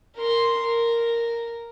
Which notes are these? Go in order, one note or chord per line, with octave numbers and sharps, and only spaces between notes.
A#4 C6
A#4